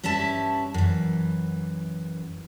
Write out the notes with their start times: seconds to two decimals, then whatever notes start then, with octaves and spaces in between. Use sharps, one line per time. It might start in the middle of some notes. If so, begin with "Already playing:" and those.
0.04 G2 C#4 E4 E5 A5
0.74 F#2 E3